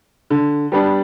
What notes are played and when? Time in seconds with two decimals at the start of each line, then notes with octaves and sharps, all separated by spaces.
0.30 D3
0.72 G3 B3 D4